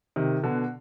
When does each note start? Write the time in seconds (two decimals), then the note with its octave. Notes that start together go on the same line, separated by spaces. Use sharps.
0.16 C3 D#3
0.43 B2 D3